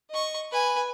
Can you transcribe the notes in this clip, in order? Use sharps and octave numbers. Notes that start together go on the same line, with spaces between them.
D#5 C#6
B4 G#5